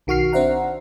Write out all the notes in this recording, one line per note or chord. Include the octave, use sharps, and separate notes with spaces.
B1 D#3 F#4 C#6 F6 C7
C4 D4 C5 E5 F#5 A#5